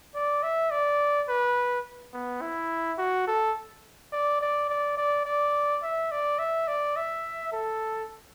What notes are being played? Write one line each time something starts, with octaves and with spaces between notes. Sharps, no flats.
D5
E5
D5
B4
B3
E4
F#4
A4
D5
D5
D5
D5
D5
E5
D5
E5
D5
E5
A4